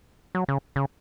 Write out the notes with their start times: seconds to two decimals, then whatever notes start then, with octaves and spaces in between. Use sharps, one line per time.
0.35 F#3
0.48 C#3
0.76 C#3